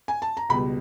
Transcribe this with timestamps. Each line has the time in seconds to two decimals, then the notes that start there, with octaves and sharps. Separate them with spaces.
0.08 G#5
0.22 A5
0.37 A#5
0.49 C#2 B2 G3 B5